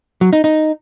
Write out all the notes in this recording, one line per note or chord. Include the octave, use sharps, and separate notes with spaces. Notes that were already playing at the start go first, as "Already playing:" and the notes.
F#3
D#4
D#4